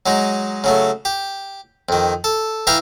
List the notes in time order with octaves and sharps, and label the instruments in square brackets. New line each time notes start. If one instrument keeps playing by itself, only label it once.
[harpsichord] F#3 G#3 D#4
C#3 F#3 A3
G4
F2 D#3
A4
E3 E5 F5 G5 A#5